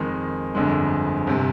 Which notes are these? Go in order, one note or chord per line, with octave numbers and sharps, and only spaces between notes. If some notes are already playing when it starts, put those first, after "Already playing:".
Already playing: F2 D#3 G#3
G1 F2 D3 G#3
G1 C3